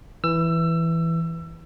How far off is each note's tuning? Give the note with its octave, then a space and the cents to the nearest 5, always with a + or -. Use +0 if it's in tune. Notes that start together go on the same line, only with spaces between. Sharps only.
E3 +0 E6 +25